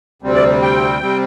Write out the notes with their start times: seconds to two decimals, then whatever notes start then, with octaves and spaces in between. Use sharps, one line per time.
0.22 D2 C3 G3 C4
0.35 D5
0.62 G5
1.02 C3 G3 C4